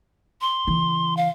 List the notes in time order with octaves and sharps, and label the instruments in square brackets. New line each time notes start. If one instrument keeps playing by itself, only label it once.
[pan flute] C6
[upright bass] C#3 E3
[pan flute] F5